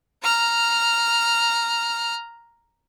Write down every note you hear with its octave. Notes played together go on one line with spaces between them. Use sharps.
A#5 F6